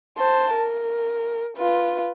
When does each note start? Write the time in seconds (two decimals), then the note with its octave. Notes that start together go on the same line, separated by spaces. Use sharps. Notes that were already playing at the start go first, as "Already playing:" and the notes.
0.18 C5 A5
0.55 A#4
1.57 F4 B4